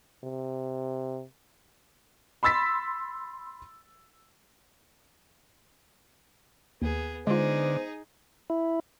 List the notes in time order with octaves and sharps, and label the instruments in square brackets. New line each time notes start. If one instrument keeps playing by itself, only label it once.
[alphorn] C3
[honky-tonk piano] B5 C6 E6 A6 B6
[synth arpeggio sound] D#2 [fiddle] B3 G#4
[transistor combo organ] D3 [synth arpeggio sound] G#3 F4 [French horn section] B3 C5 [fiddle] D#4 G#4
[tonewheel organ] E4